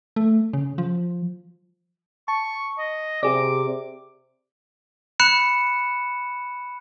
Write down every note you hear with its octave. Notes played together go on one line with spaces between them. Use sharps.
A3
C#3
F3
A5 C#6
D#5
C3 G4 G#4 D5 D6
B5 F#6 C#7 E7